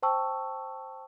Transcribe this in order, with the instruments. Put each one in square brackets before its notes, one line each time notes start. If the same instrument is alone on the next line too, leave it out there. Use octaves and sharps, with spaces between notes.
[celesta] C5 G5 A5 C#6 E6